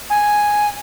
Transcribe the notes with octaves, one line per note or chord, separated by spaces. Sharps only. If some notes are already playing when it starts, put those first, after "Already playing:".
G#5